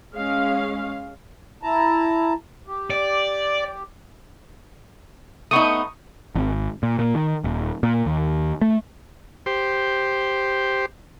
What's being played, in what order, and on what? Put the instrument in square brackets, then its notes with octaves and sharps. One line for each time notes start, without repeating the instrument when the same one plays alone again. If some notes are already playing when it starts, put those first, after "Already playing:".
[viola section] G#3 C#4 F5
[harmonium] E4 A5 A#5
G4
[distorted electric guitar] D5
[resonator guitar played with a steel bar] A3 B3 D#4 [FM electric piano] C#6 D#6
[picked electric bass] G#1
A#2
A#2
D#3
D#1
A#2
D#2
A3
[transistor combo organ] G4 C5